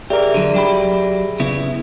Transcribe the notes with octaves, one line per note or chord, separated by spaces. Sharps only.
G4 G#4 A#4 D5 E5
D3 F#3
F#3 G4 B5
C#3 B3 E4